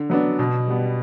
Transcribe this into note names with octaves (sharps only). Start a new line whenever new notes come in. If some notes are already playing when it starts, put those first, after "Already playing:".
Already playing: D3
F#3 B3 D4
B2
G3 B3